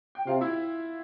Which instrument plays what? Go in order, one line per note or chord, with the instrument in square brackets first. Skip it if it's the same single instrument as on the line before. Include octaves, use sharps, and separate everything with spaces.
[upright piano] G5
[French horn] C3 [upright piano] F4 F5
[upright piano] E4 E5